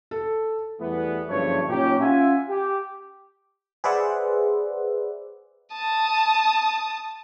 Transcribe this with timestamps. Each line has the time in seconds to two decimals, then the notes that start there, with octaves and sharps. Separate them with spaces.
0.11 A4
0.81 E2 E3 G3 A3 B3
1.29 F#1 D2 G2 F3 A3 C#5
1.69 A#2 F#3 C#4 D#4 G4
2.00 C#4 F4 E5 F#5 G#5
2.49 G4
3.84 G#4 B4 C5 D5 E5 F#5
5.73 A5 D#6